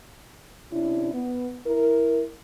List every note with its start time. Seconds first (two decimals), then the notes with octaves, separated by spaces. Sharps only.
0.72 C3 C#4 D4 E4
1.14 B3
1.67 E4 A#4